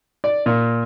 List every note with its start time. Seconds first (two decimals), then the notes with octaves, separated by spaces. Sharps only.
0.24 D5
0.46 A#2